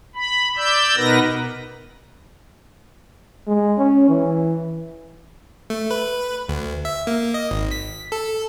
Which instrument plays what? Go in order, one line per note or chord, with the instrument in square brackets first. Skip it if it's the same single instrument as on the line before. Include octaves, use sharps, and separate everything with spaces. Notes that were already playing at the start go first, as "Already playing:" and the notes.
[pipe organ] B5
D5 E6 G6
B2 B3 D#4 A#4 B4 A#6
[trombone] G#3
C#4
E3
[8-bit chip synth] A3
B4
D2
E5
A#3
D#5
G#1
B6
A4